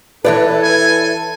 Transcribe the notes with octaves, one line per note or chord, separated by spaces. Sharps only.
E3 A4 B4 C#5 D5 E5
G#5